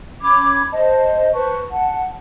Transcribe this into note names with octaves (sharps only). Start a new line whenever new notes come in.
C#4 B5 D6 G#6
C5 D#5 A5
B4 C5 A5 C#6
F#5 A5